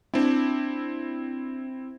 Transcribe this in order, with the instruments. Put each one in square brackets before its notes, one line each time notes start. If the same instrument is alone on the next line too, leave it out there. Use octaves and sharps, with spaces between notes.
[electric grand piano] C4 E4 [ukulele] D4